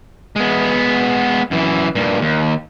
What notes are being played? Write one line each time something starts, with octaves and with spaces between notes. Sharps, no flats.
G#3 B3
F#2 E3
G2 A#2
D#2